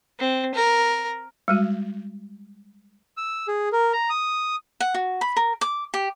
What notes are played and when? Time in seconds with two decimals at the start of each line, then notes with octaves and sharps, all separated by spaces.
0.19 C4
0.55 A#4
1.48 G3 G#3 F#4
3.17 E6
3.48 G#4
3.72 A#4
3.93 A#5
4.10 D#6
4.80 F#5
4.94 F#4
5.21 B5
5.37 A#4
5.61 D6
5.94 G4